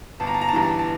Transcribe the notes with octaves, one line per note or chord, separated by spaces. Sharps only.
G1 A5
A#5
A5
A#5
A5
G2 E3 A#5
A5
A5